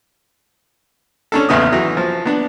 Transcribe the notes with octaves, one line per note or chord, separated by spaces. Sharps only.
C#4 D4 A4
A1 E2 C#3 B3 D#5 D#6
E3 F#3
F3
B3 D4